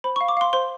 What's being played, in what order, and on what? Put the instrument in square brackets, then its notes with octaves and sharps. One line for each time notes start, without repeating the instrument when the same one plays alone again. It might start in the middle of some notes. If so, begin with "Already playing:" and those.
[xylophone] C5 B5
C#6
F5
D6
F5 C6
C5 C6